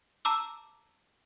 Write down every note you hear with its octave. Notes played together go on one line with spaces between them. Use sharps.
A5 A#5 D6 E6